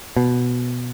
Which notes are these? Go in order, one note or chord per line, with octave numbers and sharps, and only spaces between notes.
B2